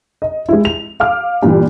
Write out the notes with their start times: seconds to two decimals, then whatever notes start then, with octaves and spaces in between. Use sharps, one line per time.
0.22 D#5
0.49 G#3 E4
0.65 F7
1.00 F5 D6 F6
1.43 G2 A#2 E3 G3